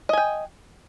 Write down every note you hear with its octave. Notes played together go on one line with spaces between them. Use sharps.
D#5 G5 G#5